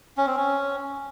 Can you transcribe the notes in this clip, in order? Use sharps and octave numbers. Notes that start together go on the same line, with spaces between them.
C#4
C4
C#4